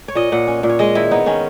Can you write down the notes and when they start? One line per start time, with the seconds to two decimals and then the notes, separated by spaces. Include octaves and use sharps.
0.08 C#5
0.15 A#2 D#5
0.32 A#2 F#5
0.47 C#4
0.63 A#2
0.69 C#5
0.79 G#3 D#5
0.95 D#3 E4
1.11 B3 D#4
1.26 D#3 C#4